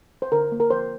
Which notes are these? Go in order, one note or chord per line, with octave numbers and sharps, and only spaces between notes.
C5
D3 A#4
A#3
A#4
F3 C5